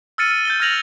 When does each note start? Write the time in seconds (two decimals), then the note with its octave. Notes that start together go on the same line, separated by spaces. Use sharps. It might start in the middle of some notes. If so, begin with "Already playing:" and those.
0.18 E6 F6 A6 C#7 D#7
0.31 D#7
0.45 G6 A6 G7
0.60 F6 G#6 A#6 F7 F#7